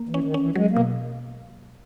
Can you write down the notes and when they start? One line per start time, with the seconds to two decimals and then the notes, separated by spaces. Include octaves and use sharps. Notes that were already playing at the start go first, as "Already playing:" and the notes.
Already playing: A#3
0.09 E3
0.14 C#4
0.24 D#3
0.34 C#4
0.40 E3
0.56 F#3 G#3
0.71 A#3
0.76 B2